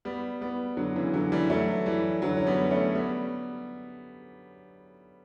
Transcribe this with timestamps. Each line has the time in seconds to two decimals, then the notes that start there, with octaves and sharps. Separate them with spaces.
0.05 G3 B3
0.41 G3 B3
0.77 D3 F#3
0.96 C#3 E3
1.14 D3 F#3
1.32 E3 G3
1.50 F#3 A3
1.86 E3 G3
2.22 D3 F#3
2.37 C#4
2.47 G3 B3
2.70 A3 C#4
2.95 G3 B3